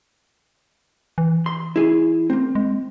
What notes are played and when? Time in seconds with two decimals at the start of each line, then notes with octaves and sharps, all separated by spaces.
1.18 E3
1.46 C6
1.76 E4 G#4 G#5
2.30 A#3 C4
2.55 G#3